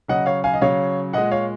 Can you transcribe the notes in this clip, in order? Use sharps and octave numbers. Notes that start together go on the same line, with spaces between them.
C#3 F#3 D#5 F#5
C#5 F5
F5 G#5
D#5
C#3 F#3 C#5 F5
A#2 G#3 D#5 F#5
C#5 F5